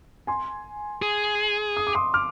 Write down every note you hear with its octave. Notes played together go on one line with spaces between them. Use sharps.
G#5 C6
G#4
D#6
D6
C6 D#6
D6 F6